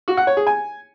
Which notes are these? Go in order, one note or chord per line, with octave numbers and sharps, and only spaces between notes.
F#4
F#5
C#5
G#4
G#5